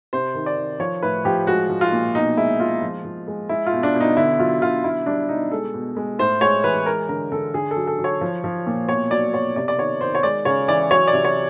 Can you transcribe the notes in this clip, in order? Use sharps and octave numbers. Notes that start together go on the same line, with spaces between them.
C3 C5
D#3
D5
D#3
F3 C#5
A2 B4
F3 G4
G#3 F#4
F3
F4
A#2
B2 D#4
G#3 E4
G#3 F4
F3
F3
G#3
G#3 E4
F4
B2
D4
B2
D#4
D3 E4
F#3 F4
D3 F4
B2 E4
G3 D4
B2 D#4
G#3 A4
B2
G#3
A2 C5
G#3 C#5
E3 B4
G#3 A#4
D3 A#4
D3 A4
D3 G#4
A4
F#3
A4
F#3
C#5
F3
F3
A#2
B2 C#5
F#3 D5
B2 C#5
C3 D5
D5
D#3 C#5
D#3 C5
C#5
G#3 D5
C#3 C#5
E3 D5
F#3 C#5
D5
C3
C#5